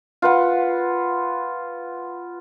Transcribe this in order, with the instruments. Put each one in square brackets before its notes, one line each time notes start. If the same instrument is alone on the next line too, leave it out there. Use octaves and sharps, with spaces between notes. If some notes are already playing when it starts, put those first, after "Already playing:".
[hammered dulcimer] F4 B4 F#5